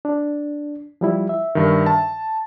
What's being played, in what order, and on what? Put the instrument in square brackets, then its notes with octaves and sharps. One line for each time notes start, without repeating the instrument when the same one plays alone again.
[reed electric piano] D4
F3 G3 E4
E5
[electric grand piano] G2 D#3
A5